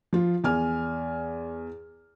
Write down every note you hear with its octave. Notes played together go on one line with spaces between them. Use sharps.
F3 F4
E2 G#5 F6